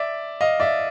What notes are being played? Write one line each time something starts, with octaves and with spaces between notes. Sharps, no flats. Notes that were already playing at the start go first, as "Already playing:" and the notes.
Already playing: D5 E5
D#5 F5
D5 E5